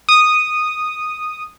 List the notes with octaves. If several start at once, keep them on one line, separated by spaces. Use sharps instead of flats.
D#6